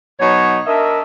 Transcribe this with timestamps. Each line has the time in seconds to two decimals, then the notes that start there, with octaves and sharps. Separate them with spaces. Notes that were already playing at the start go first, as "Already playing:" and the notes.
0.20 B2 F#3 D#4 C#5
0.66 D4 A#4 D#5 E5